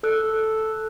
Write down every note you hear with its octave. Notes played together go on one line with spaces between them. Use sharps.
A4 E6 F#6